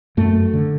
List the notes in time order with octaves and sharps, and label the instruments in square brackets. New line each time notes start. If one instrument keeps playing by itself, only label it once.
[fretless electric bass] F#2 A3
D3